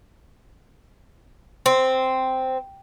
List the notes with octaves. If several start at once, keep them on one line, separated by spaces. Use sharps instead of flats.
C4